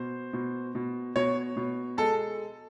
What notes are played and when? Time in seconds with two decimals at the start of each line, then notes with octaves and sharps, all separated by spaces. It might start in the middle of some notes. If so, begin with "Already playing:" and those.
Already playing: B2 C5
0.33 B2
0.75 B2
1.16 B2 C#5
1.56 B2
1.97 G#3 A4